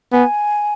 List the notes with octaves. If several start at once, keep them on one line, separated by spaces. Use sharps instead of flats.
B3 G#5